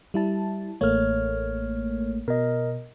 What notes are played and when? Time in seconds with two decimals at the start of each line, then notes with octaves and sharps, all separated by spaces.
0.14 G3 E4 A5
0.81 A1 A3 A#3 C#5 F6
2.28 B2 A#4 D#5